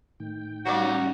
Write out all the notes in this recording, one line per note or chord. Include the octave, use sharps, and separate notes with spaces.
A2 D#3 G5
F#3 G3 A#3 C#4 D#4 F#4 D5